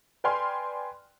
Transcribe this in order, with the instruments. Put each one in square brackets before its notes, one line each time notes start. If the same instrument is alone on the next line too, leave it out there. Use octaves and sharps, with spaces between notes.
[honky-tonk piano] B4 D5 G5 G#5 C6 F6